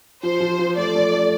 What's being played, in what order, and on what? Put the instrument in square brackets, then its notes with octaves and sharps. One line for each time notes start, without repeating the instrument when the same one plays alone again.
[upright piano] F3 [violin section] C5
[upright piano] F3
F3
[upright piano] A3 [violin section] D5
[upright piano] A3
A3